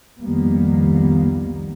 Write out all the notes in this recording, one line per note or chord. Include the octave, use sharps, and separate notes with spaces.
C2 F2 D#3 G3 A#3 B3